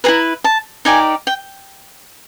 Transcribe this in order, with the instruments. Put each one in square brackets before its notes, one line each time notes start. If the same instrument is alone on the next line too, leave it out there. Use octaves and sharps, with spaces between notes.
[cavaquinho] E4 G#4 B4 A#5
A5
D#4 G4 A#4 D5 G#5
G5